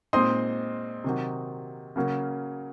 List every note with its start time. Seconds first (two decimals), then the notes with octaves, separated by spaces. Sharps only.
0.13 A#2 G#3 C4 D#4 C6 D#6
1.04 C3 D#3 F#3
1.96 C#3 F#3 A#3 C#4